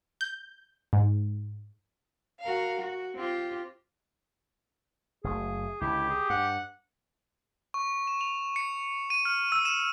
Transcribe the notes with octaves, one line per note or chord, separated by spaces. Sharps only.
G6
G#2
F#4 A#4 F5
F#4
C4 F4 G4
F#1 A3 G#4
C#2 D3 E4 G4
G#4
G2 F#5
C#6
E7
F7
C#7
D#7
F6
E6
E7